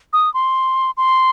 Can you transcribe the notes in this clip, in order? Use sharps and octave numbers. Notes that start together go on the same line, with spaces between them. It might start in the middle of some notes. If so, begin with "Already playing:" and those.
D#6
C6
C6